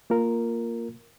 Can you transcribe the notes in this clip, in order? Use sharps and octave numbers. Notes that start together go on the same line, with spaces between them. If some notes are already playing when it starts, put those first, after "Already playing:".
A#3 F4 A#4